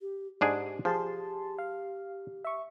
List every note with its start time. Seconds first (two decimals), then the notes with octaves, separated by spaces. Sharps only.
0.01 G4
0.41 G#2 D4 G4 G#4
0.85 F3 G4 G#4 A5 C6
1.58 F5
2.44 E5 C#6